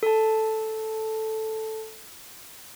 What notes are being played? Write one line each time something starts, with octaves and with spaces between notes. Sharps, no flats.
A4 A5